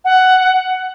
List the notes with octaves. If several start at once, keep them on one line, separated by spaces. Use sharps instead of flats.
F#5